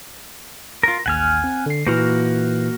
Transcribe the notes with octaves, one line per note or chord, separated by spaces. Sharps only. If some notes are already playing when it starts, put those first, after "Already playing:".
F4 A#4
A1 D#2 F#5 G#5 F6
C4
D3 C7
A#2 E3 A#3 F#4 A#4 G6